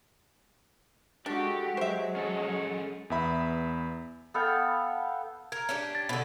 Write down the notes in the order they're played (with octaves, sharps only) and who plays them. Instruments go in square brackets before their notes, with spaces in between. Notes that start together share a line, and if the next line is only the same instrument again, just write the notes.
[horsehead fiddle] G#3 F#4 [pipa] D4 [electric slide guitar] G4 [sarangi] A4
[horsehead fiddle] F#3 [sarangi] G#3 [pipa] C5 E5
[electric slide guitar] C#4 A4
[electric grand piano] E2 B3 E5 B5
[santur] B3 A4 F5 G5
[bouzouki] A#4 [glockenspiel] G#6
[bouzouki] C#4 D4 G4
[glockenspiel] A6
[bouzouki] B2 D3